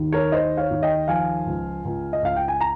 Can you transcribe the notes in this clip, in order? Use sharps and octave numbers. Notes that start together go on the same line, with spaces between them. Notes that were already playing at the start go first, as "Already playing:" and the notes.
Already playing: D#2 D#3
A#4 C#5
D#3 C5 D#5
C#5 F5
D#2
D#5 G5
F3 F5 G#5
C#2
C#2
D#5
C#2 F5
G5
G#5
A#5